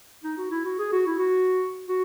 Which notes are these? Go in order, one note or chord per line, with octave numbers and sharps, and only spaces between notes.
D#4
F#4
E4
F#4
G#4
F#4
E4
F#4
F#4